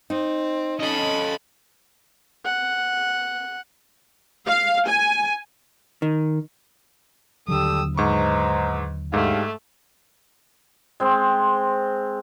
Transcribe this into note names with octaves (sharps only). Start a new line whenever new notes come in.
C4 D#4
C#4 A4 D#5 B5
F#5
F5
G#5
D#3
D#2 D3 F#3 G3 G4 A4 D#6 E6
G#2 B4 C5 D#5 A#5 C#6
G#2 A3 D4 G4 F5
G#3 C4